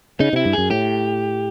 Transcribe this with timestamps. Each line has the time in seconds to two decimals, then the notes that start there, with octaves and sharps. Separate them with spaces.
0.20 C#3 D#4
0.33 C3 E4
0.45 G2
0.53 F#2 G#4
0.71 A2 G4